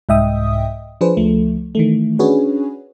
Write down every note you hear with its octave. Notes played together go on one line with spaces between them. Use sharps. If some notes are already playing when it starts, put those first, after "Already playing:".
C2 G#2 D#5 E5 G5 D#6
F3 D4 G#4 B4 C5
C#2 F3 A3
D#3 E3 A3
C#4 D4 F#4 G#4 B4 C#5